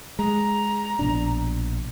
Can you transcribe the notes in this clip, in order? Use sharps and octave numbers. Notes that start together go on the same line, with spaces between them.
G#3 A#5
A#1 B2 D4